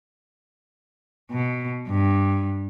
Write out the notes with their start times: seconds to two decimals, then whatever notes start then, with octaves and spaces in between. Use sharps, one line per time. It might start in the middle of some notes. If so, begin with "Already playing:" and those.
1.31 B2
1.89 G2